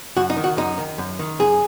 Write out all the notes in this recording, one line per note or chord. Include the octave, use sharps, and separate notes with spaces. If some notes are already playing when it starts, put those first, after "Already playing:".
F#2 F#4
D#4
D#3
F#4
F#2 D#4
D#3
F#2
D#3
F#2 G#4